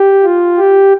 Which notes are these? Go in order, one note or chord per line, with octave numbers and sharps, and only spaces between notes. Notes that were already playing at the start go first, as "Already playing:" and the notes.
Already playing: G4
F4
G4